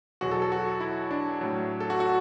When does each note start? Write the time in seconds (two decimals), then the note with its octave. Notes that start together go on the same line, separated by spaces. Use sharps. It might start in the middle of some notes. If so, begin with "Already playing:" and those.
0.21 E2 B2 F#3 F#4
0.31 A4
0.42 A4
0.52 F#4
0.80 E4
1.11 D4
1.41 A2 F#3
1.80 A4
1.90 F#4
2.00 F#4